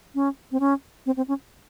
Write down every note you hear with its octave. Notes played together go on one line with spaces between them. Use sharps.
C#4
C4
C#4
C4
C4
C#4